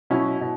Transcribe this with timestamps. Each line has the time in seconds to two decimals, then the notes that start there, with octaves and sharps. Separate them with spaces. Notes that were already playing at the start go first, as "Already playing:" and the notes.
0.10 B2 F#3 C#4 E4
0.41 B2